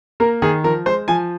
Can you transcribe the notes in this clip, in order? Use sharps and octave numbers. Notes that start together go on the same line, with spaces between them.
A#3 A#4
D#3 G#4
F3 A#4
G#3 C5
F3 G#5